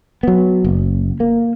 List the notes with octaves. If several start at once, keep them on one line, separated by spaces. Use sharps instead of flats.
F#3 B3
F#1
A#3